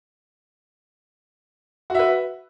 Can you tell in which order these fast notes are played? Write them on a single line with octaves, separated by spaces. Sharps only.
F#4 E5 B4